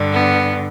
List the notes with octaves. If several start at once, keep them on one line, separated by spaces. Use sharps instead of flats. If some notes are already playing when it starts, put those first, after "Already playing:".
Already playing: G2 D3
B3